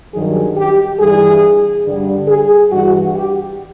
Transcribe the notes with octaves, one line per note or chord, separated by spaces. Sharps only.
G2 D#3 F#3 G#4
G4
G2 E3 G3 G#4
G2 D3 G3
G#4
G2 E3 G3 F#4
G4